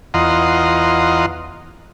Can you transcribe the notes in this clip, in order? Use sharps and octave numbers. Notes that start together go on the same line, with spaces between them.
E2 F4 D#5 F#5 A#5 C6